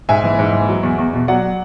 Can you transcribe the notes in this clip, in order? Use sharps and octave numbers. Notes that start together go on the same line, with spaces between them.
G#2 E5 G#5
E3
G#2
E3
F#3
E2
E2
B2
F#3 D5 F#5